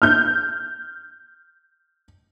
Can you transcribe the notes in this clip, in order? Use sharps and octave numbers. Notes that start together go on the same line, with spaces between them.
F6 G6